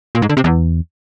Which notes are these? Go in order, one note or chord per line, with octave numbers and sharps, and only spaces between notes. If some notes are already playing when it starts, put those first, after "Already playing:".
A#2
G#2
D3
C3
E2